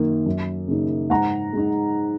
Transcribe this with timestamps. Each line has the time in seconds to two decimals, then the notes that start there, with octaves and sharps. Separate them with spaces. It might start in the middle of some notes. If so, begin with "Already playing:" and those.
Already playing: F#2 D#3 A#3
0.26 F#2
0.68 C#3 A#3 D#4
1.10 G#2 F#5 A#5
1.53 G#3 D#4